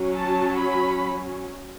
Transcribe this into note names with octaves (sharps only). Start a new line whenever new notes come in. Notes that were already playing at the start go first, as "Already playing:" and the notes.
Already playing: F#3 C#4
A5
B5